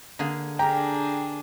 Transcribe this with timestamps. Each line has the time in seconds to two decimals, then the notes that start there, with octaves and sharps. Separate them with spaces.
0.19 D3 A#3 G#4
0.59 D4 G4 G#4 A#4 G5 A#5